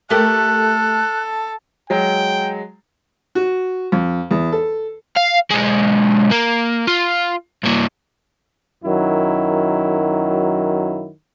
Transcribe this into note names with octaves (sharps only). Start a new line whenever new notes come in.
A3 G4 A4 A#4 F#6
F#3 G#3 G5
F#4
F2
E2
A4
F5
B1 G#3
A#3
F4
G2 A#3
F#2 D#3 F#3 E4